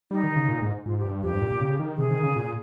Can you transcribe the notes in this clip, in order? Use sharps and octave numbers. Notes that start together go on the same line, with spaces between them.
G3 D#4
D#3
C#3
A#2
G#2
G#2 F4
G4
G2
F2 G4
G2
A#2
A#2
C#3
D#3
C3 G#4
D#3
C#3
A#2